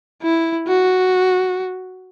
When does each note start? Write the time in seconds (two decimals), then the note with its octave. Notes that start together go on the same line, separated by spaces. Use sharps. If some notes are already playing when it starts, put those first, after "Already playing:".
0.22 E4
0.68 F#4